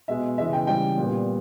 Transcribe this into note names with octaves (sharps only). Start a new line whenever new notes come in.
B2 G#3 B3 E5
C#3 E3 G#3 B3 E5
G5
C#3 E3 G3 G5
A#2 G3 B3